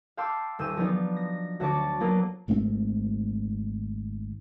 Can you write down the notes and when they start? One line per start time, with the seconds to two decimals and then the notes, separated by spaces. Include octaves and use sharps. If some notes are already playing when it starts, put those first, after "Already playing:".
0.17 F5 G5 A5 C6 D6 E6
0.59 D#1 E6 G6 D#7 E7
0.76 F3 F#3 B3 D4 D#4 F4
1.16 A#6
1.60 D2 F#4 C#5 A5 D6 A6
2.00 F#3 A#3 B3 F4
2.48 G#1 G#2 A3 C4